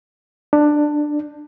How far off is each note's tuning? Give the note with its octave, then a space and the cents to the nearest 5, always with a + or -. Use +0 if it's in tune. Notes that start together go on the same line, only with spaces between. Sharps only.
D4 +15